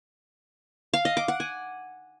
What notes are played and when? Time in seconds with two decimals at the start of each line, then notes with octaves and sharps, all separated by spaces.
0.94 F5
1.05 D#5
1.17 D6
1.28 F#5
1.40 G#5